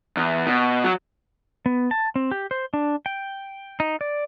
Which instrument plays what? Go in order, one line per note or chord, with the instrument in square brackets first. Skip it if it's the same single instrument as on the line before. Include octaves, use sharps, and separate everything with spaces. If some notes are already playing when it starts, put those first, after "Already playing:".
[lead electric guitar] E2
B2
F#3
[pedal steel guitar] B3
A5
C4
G4
C5
D4
G5
D#4
D5